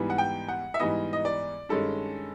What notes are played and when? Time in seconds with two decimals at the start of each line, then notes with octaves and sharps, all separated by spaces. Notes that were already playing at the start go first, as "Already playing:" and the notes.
Already playing: G#2 E3 G3 B3
0.10 F#5
0.18 G5
0.48 F#5
0.74 E5
0.80 G#2 E3 G3 B3 D#5
1.13 D#5
1.25 D5
1.69 G2 D#3 G#3 C#4 A4